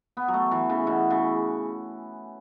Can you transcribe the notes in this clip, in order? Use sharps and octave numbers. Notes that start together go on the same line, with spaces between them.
B3
F#3
A3
E3
C#3
B2
C#3